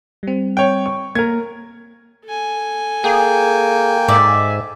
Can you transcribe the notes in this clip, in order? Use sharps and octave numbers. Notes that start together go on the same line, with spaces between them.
G3 C4
C#5 G5
C#6
A#3 A#4 G#6
A4 G#5
A#3 G#4 G5
G#2 D5 E5